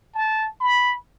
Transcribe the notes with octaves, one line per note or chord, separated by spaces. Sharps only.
A5
B5